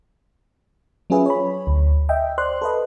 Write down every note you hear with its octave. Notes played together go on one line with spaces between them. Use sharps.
F#3 C#4 F4 G#4 B4 E5
C#5 B5
D2
D#5 E5 G5
C5 D5 C6 F#6
A4 B4 D#5